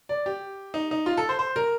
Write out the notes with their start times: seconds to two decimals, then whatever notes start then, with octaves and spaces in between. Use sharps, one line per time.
0.09 D5
0.26 G4
0.74 D#4
0.91 D#4
1.06 F4
1.17 A4
1.29 C5
1.39 C5
1.56 A#4